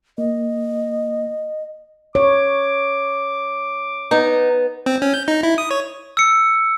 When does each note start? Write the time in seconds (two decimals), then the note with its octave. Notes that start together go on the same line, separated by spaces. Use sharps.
0.18 A#3 D#5
2.15 C#5 D6
4.11 B3 D#4
4.86 C4
5.02 C#4
5.14 G6
5.28 D#4
5.43 E4
5.58 D#6
5.71 C#5
6.17 E6 C#7